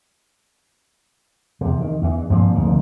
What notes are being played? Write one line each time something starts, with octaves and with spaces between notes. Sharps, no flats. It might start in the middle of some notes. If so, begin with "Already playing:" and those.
E2 C3
D#3
E2 E3
G2 A#2 F3 C4
F1 D2 C3 D#3